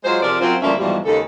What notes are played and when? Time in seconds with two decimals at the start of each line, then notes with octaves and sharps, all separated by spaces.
0.04 F#3 G#3 F4 C5
0.22 C3 F3 G#4 A#4 D5
0.40 F#2 C4 F4
0.62 D2 F3 G3 A#3 C#4 E5
0.78 G#2 B2 E3 F3 G3
1.05 D#2 C#3 G#3 A4